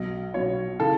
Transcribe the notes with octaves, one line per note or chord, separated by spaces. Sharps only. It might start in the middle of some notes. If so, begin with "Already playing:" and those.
Already playing: B1 B2 F#3 D#5
B1 B2 F#3 C#5
C#3 E3 A4